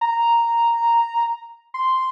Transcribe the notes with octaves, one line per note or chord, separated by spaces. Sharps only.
A#5
C6